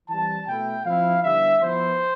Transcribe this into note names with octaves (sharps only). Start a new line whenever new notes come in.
E3 G3 C4 A5
B2 A3 E4 G5
F3 C4 E4 F5
D3 G3 B3 E4 E5
F3 B3 E4 C5